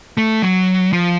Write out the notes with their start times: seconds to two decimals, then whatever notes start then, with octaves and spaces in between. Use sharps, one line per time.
0.17 A3
0.42 F#3
0.93 F3